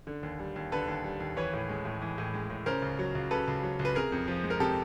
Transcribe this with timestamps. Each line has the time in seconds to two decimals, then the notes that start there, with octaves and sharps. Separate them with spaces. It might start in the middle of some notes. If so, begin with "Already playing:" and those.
0.07 D3
0.23 D#2
0.39 G3
0.56 D#2
0.72 D3 A4 B4
0.88 D#2
1.04 G3
1.20 D#2
1.37 E3 B4 C#5
1.53 A2
1.69 G#3
1.85 A2
2.02 E3
2.18 A2
2.34 G#3
2.50 A2
2.66 C#3 A#4 C5
2.82 C#2
2.99 F#3
3.15 C#2
3.31 C#3 A4 B4
3.48 C#2
3.63 F#3
3.79 C#2
3.85 B4
3.95 C3 G#4 A#4
4.12 F2
4.28 F3
4.44 G#3
4.50 A#4
4.60 C3 G4 A4